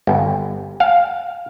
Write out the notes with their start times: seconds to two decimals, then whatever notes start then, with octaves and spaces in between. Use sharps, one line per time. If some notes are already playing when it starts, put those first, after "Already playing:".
0.07 G1
0.80 F5